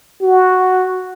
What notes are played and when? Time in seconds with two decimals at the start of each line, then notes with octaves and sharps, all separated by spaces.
0.21 F#4